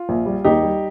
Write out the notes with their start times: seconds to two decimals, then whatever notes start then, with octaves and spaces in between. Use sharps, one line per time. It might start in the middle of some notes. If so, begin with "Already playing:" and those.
Already playing: F4
0.09 A#1
0.26 G3
0.44 D#2 D#4 G4
0.63 G3